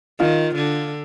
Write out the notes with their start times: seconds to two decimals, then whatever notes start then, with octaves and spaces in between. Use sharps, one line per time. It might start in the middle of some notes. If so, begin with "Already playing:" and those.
0.19 D#3 F4
0.55 D3